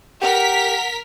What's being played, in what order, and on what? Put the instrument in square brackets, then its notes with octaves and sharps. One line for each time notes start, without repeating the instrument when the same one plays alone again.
[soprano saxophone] G4 [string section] A#4 B6 [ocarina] F#5